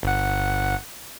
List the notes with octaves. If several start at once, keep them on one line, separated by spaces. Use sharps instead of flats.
G1 F#5